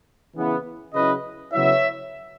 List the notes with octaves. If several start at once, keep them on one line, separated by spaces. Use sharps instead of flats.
C#3 E3 B3
C#3 F#3 C#4 E4 B4 D#5
C#3 F#3 B3 E4 C#5 E5